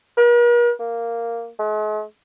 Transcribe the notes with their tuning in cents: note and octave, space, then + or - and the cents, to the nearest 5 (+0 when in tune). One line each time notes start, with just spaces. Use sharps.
A#4 +45
A#3 -5
G#3 +45